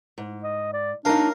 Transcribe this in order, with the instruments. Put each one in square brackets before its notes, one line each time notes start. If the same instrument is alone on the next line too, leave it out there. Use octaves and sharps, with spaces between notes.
[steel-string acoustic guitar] G#2
[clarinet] D#5
D5
[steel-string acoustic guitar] F#3 A#3 D#4 [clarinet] D4 [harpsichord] A#4 F5